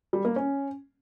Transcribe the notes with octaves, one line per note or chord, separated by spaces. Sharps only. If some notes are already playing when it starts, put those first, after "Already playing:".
G3
A#3
C#4